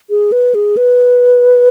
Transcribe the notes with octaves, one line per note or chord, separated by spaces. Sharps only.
G#4
B4
G#4
B4